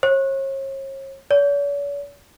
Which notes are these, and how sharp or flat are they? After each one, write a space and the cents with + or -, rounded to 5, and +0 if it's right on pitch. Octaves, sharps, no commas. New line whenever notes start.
C#5 -40
C#5 +45